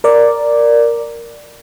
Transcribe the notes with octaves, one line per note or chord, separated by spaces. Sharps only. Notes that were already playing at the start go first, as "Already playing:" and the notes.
A#4 D5